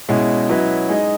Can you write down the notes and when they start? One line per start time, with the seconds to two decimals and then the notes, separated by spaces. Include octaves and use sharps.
0.09 B2 G#3 C#4 E4
0.49 F#3 C#4 E4 B4 D#5
0.89 G#3 D#4 G#4 D#5